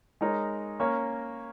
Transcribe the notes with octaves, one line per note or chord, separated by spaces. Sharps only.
G#3 D#4 A#4 C#5
A#3 C#4 A#4 C#5